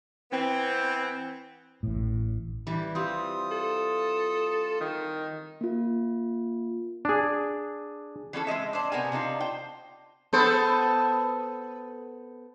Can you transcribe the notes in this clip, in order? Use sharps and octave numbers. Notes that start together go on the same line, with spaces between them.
E3 B3 C4
A1 A2
E3 G3
C4 F4 G4 D#6
A4
D#3
A#3 F4
D4 G#4
E3 G3 C#4 A4
G#3 C4 D#5 E5
D4 C5
C3 B3 A#4 G#5
C3 D4 D#4 F4
C5 G5
B3 A4 C5